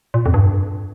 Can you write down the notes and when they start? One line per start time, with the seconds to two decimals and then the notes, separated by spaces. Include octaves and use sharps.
0.14 A#2
0.26 F2
0.34 G2